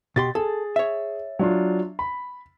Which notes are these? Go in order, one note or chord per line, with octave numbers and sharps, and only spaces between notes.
B2 G4 C6 A6
G#4 A4
C#5 E5
F#3 D4 F4
B5